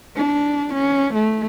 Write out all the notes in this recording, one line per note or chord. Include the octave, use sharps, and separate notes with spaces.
D4
C#4
A3